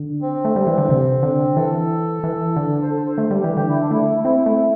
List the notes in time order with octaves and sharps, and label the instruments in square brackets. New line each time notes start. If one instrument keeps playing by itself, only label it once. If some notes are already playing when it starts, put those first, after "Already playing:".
Already playing: [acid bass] D3
[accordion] C4
[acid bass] A3
G3
E3
D3
C3
D3
[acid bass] E3 [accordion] A4
[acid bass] E3
D3
[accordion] C5
A4
C5
[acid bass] A3
G3
[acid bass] E3 [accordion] G4
[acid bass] D3 [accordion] G4
[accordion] E4
D4
[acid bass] A3 [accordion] E4
[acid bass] C4 [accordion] E4
[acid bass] A3